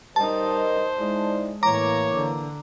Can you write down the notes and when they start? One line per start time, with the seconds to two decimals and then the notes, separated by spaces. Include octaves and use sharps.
0.16 G3 D#4 A#4 C5 D#5 A5
0.97 G#3 D#4 E4 D5
1.63 A2 E3 A#3 C#5 A#5 D6
2.14 D3